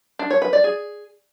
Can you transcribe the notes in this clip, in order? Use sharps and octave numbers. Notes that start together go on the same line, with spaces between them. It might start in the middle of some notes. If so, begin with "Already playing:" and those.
D4
C#5
B4
D5
G#4